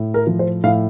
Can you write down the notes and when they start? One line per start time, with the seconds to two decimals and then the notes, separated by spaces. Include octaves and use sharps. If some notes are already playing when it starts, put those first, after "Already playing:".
Already playing: A2
0.14 A#4
0.27 F3
0.39 C5
0.64 A2 F5